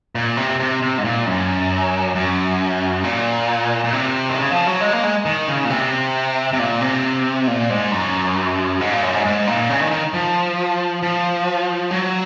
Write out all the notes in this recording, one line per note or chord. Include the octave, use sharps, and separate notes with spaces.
A#2
C3
C3
C3
G#2
A#2
F#2
F#2
A#2
A#2
C3
D#3
C#3
F3
F#3
G#3
A#3
G#3
D#3
C#3
A#2
C3
C3
A#2
C3
A#2
G#2
F#2
G#2
A#2
F#2
G#2
G#2
A#2
C#3
D#3
D#3
F3
F3
F#3